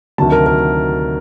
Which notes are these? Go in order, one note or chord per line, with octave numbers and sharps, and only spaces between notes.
D2 C3 D#3 F#3 A5
A#4
A#4